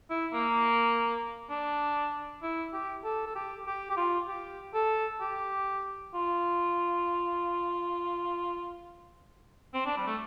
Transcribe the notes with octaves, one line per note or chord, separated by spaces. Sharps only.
E4
A#3
D4
E4
G4
A4
A4
G4
G4
G4
F4
G4
A4
G4
F4
C4
D4
G3
A3